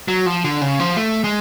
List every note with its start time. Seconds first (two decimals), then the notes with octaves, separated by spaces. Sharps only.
0.08 F#3
0.26 F3
0.44 D3
0.61 C#3
0.80 F3
0.97 A3
1.24 G#3